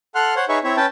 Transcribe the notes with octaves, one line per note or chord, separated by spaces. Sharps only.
A4 F#5 C6 F6 F#6
C5 C#5 F#5
D#4 G#4 B4 C#5 E5 C#6
C4 E4 C#5 E5
C#4 B4 G5 A5